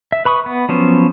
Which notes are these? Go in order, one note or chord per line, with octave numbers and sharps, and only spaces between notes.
E5
B4 B5 C#6 D#6
B3
F3 F#3 B3 C#4 C5